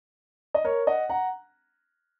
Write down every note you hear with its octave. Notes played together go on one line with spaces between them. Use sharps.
D#5
A#4 C#5
D#5 F#5
F#5 A#5